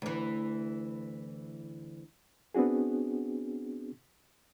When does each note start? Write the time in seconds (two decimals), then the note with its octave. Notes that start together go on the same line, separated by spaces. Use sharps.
0.02 D2 E3
2.55 B3 C4 D4 F#4 G#4